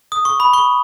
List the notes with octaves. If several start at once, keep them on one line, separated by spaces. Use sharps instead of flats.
D#6
C#6
B5
C#6